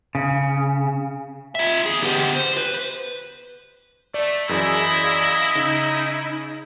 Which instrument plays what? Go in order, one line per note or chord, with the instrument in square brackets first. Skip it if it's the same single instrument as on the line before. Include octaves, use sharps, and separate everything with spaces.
[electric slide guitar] C#3
[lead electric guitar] F4 E5
E2 G#4
B3 G4
C5
B4
[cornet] A3 [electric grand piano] D5
[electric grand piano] F#2 E3 D5 [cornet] E4 [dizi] G#4 [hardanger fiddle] D#5
[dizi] F5
[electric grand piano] C#3 [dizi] D#4